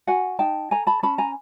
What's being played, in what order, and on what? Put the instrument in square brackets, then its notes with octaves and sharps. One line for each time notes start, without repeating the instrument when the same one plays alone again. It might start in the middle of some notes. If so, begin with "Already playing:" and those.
[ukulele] F#4 F#5 G#5
D#4 G5 A5
A4 G#5 A#5
A5 B5
C#4 A5 B5
G#5 A#5